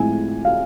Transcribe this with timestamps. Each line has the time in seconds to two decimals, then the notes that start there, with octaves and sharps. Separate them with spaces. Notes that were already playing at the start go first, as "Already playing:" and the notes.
Already playing: A2 F3 G#3 C4 E4 G#5
0.45 F5